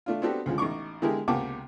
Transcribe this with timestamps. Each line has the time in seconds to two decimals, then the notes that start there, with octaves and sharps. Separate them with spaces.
0.06 A3 D4 F4
0.22 B3 C4 D4 F#4 G4 A4
0.46 D2 C#3 F3 G#3
0.58 A1 D#4 C#6 D6
1.02 D3 G#3 E4 G4 G#4 A#4
1.28 C#2 C3 A#3 F#5 A5 D6